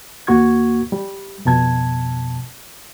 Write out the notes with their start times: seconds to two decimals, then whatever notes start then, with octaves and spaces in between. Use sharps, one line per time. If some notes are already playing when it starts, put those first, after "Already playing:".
0.27 D#2 A#3 F#4 C#6 G#6
0.92 G3
1.45 F2 B2 A5 G#6